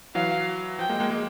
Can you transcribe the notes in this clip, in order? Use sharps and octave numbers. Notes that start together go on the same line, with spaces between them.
E3 F#3 F5
F3 G5
G#3 A#3
G#3 A#3
G#3 A#3